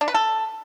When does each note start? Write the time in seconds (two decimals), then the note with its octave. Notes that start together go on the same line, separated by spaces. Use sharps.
0.01 D4
0.08 B4
0.14 A4